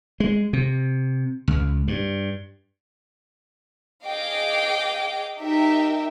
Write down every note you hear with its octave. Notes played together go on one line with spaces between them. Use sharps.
G#3
C3
C#2
G2
G#4 D#5 F5 G5 D6
D#4 G4 A#4 E5 G5